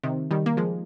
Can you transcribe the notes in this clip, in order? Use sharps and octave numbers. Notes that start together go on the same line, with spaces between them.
C3 D#3
D#3 G3
A#3
F3 G#3